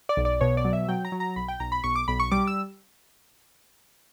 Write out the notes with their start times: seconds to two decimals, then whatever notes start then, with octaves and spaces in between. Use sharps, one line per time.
0.09 D5
0.17 B1
0.25 D5
0.41 B2 C#5
0.57 D5
0.65 F#3
0.73 E5
0.88 F#3 G5
1.05 A#5
1.12 F#3
1.20 A#5
1.36 B1 B5
1.48 G5
1.60 B1 A#5
1.72 B5
1.84 B1 C#6
1.96 D6
2.08 B1 B5
2.20 C#6
2.31 G3 D6
2.47 E6